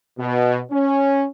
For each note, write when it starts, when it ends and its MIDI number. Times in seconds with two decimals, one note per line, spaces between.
0.18 0.60 47
0.72 1.26 61